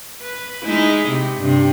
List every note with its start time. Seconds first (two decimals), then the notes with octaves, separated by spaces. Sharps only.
0.22 B4
0.65 G#3 D#4 E4
1.09 C3
1.39 G2 C3